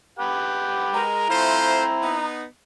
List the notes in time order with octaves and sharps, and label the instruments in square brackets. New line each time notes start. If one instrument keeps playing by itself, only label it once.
[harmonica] G4 B4 F#5
[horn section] G#3 A#4 [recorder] A#5
[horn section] F3 A3 C5 [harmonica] C4 E4
[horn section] B3 D#4